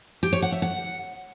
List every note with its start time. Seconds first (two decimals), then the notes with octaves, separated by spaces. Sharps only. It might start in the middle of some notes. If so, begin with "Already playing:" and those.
0.23 G4
0.33 C#5
0.42 F#5
0.52 E5
0.62 F#5